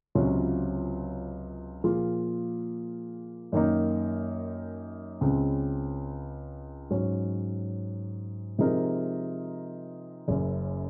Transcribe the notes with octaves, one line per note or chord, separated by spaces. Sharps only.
C#2 C3 F#3 C#4 F4
A#2 F3 A#3 F4 G#4
F#2 D#3 A#3 D#4
C#2 C#3 G#3 C4
G#2 F#3 C#4
C3 F3 G#3 D#4 A#4
F#1 F#2 C#3